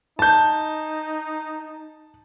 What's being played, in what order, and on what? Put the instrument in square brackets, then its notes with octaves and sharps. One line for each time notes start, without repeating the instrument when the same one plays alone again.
[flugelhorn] D#4 [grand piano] A5 G6